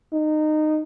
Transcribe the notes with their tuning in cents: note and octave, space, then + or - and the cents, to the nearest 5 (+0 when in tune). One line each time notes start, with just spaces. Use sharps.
D#4 -20